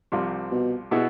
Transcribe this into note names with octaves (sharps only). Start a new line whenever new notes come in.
C2 C3 F3
B2
B2 B3 E4 G#4